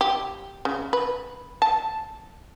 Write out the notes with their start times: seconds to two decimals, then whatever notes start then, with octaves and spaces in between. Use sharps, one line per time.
0.01 G4
0.65 C#3
0.93 B4
1.62 A5